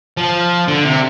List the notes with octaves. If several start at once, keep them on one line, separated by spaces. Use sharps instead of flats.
F3
D3
C3